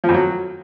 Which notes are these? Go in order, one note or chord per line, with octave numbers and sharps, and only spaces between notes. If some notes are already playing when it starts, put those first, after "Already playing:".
F3
F2
F#3